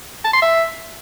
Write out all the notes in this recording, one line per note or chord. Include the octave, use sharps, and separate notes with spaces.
A5
C6
E5